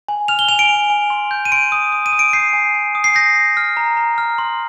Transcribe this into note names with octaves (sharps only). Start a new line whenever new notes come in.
G#5
F6 F7
G7
G#5 F7
D7
G#5
G#5
C6
G6
D#7
C6 D7
D#6
D#6
D#7
D#6
D7
G6 C7
G#5
G#5
D#6
C7
G6 A#6
D#6
F6
A#5
A#5
F6
C6